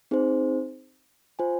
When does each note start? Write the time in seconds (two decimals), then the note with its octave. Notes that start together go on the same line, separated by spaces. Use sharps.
0.11 C4 D#4 G#4 C5
1.39 F4 C5 G#5